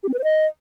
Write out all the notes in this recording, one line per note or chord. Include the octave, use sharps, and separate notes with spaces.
G4
C4
B4
C5
D#5